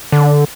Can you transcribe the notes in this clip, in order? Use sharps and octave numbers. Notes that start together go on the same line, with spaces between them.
D3